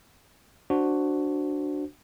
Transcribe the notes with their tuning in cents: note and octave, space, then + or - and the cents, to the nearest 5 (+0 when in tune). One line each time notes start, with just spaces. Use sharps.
D4 +0 F#4 +0 C5 +0